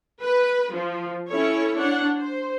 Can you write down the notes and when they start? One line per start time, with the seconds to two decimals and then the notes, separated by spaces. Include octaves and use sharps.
0.22 B4
0.72 F3
1.29 C#4 E4 A4 C#5
1.79 D4 C#5 F#5
2.18 C5